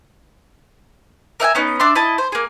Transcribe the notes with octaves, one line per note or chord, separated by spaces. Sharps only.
A#4 E5 G5 G#5
B3 C#4 D#4
D4 D5 E5 C6
E4 D#5 A5
C5
A#3 G#4